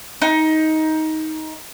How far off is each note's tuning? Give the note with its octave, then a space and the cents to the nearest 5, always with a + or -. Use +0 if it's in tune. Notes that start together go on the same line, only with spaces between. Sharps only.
D#4 +15